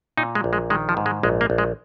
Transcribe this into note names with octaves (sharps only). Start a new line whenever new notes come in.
A#2 D#4
G#3
A#1
G#3
D#3 G#3
F3
G#2
G#3
A#1 G#3
A#3
A#1
G#3